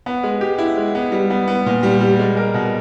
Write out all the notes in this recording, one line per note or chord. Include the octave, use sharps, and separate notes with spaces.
B3
G#3
G4
E4
G#3
B3
G3
B3
B3
A#2
G3
G3
G#3
A#4
B2